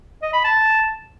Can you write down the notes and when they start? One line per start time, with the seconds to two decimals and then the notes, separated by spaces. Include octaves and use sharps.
0.23 D#5
0.34 B5
0.45 A5